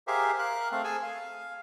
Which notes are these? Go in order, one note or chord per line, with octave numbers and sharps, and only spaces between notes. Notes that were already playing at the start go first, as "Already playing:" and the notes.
G4 G#4 A#4 C5 E5 F5
A#4 F5 F#6
A3 C4 F5
G#4 A4 G#5 E6
F5